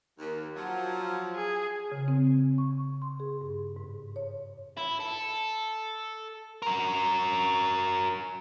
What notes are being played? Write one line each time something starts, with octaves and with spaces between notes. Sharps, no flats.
D#2
F3 F#3
G#4
C#3
C4
C#6
C6
G#4
G2
G#2
C#5
E4
A4
F#4 A#4